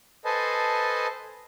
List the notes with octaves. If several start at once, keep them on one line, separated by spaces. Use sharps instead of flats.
A4 B4 C5 D#5 G#5 A5